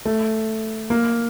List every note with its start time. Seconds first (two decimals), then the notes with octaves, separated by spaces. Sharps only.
0.05 A3
0.90 A#3